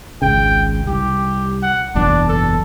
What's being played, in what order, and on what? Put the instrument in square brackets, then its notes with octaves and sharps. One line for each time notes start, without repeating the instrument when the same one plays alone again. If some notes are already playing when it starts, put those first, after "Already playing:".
[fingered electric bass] G#1 C#2 C#3 [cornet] G5
[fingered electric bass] C2 [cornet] G4
[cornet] F#5
[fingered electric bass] F#1 B1 E2 [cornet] D4
[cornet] A4